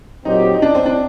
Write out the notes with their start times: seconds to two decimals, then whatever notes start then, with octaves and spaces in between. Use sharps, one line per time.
0.25 A#2 F#3 C4 D#4 G4
0.54 D#4
0.62 D4
0.75 C4
0.86 D4